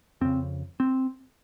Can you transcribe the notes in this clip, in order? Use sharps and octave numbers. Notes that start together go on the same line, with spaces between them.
F2 C#3 C4
C4